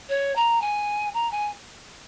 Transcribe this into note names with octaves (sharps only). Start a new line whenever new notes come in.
C#5
A#5
G#5
A#5
G#5